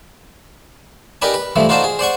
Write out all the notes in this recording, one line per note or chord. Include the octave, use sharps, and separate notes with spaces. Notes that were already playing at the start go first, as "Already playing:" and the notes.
D#4 G4 A#4 B4 D5 G#5
B4
G2 E3 F3 A3
D#4 F4 F#4 C5 D5 A5
G#4
C5 D5 F#5 C#6